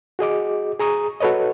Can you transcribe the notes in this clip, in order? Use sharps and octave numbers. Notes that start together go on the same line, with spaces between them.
F#4 G#4 D#5 D6
G#4 A#5 C#6 D#6
F#4 A4 B4 C#5 D#5